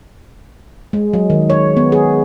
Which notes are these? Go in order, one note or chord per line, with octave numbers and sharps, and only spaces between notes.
G#3
F#3
D#3
C#5
B3
G#4